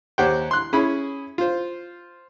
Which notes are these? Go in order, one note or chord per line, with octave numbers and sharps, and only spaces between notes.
D#2 G4 C5 C#5 F#5 G5
C6 F#6
C#4 E4 G#4 B5
F4 C5